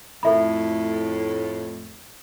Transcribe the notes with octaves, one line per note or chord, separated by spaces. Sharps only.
F2 A2 A4 E5 B5